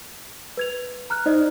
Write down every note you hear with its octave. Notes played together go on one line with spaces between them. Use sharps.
B4 G#6 F7
A#5 F6 F#6
D#4 C5 D5 D#5